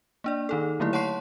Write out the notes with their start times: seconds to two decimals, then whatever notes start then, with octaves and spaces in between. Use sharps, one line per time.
0.24 A#3 D4 D5
0.49 D#3 D#4 A4
0.80 D3 F#3 A3 A#3 E4
0.93 C#5 F#5 A5 C6 C#6 C7